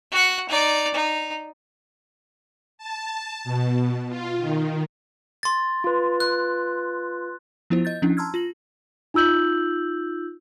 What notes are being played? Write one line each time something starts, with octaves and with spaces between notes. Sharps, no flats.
F#4 F#5
D#4 D5
D#4
A5
B2
F4
D#3
C6 A6
F4 B4
F#6
F3 B3 E4 F4 C5
D#5 G6 A6
F3 C#4 D4 E4
A5 A#5 C6 E6 F6 G#6
F4 A#6 F#7
D#4 F4 E6 G6 F#7